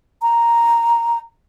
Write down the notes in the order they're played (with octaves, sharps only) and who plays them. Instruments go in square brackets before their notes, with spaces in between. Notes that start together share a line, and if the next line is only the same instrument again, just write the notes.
[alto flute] A#5